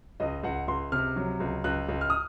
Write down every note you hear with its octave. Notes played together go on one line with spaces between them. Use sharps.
C#2 D#5
C#2 F#5
C#2 C6
C3 F6
F#3
C#2
C#2 F#6
C#2
F6
D#6